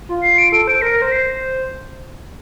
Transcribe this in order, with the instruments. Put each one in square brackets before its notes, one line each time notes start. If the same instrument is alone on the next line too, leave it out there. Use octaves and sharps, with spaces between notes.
[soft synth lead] F4
[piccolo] C7
D7
[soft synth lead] A4 [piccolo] D7
[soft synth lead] C5 [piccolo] D7
[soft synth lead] A#4 [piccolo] A#6
[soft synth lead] A#4
[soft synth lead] C5 [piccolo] A#6
[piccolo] C7